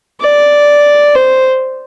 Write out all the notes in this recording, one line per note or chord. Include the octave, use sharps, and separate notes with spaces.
D5
C5